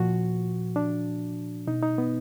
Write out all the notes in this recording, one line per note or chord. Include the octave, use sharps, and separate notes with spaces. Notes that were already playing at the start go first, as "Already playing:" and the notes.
Already playing: A#2 F3 F#4
D4
B2 D#4
D#4
B3